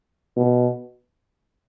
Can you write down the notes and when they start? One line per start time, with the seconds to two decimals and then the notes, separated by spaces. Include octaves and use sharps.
0.37 B2